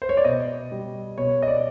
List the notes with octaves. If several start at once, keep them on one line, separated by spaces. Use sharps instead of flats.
C5
C#5
D5
B2 D#5
G3
B2 C#5
D#5
D5